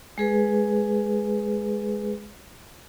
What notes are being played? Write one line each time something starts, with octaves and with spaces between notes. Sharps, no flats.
G#3 G#4 B4